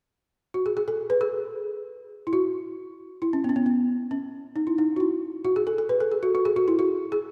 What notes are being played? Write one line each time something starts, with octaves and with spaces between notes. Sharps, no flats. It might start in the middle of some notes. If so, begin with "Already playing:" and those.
F#4
G#4
G#4
A4
B4
G#4
E4
F#4
E4
C#4
B3
C#4
B3
B3
C#4
D#4
E4
D#4
F#4
E4
F#4
G#4
A4
A4
B4
A4
G#4
F#4
F#4
G#4
F#4
E4
F#4
G#4